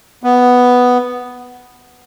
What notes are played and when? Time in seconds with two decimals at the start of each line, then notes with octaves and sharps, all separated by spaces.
0.23 B3